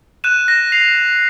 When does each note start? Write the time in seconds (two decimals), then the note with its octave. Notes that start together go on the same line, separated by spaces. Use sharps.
0.24 F#6 D#7 E7
0.48 A#6
0.72 C7 F7